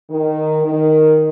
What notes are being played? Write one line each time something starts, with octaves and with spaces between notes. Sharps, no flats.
D#3
D#3